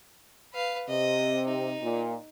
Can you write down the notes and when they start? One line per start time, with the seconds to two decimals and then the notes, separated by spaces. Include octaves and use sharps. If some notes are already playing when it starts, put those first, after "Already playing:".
0.53 B4 F5
0.88 C3 D#5
1.47 D#4
1.81 A#2